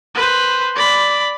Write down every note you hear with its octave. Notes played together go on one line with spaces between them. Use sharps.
B4 C5
D5 B5